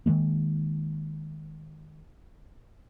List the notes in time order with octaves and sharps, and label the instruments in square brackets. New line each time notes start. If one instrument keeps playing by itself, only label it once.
[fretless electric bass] D#3 E3 G#3 A#3